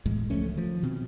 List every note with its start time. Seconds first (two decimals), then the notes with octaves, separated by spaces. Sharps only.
0.06 A1 E2 A2 G#3
0.30 C#2 F3 A3 C#4
0.54 D#3 F3
0.83 B2 C4